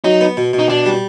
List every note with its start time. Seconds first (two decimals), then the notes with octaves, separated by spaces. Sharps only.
0.04 F#3 D#4
0.21 B3
0.37 B2
0.53 B2
0.59 D#4
0.69 B2 D4
0.86 G3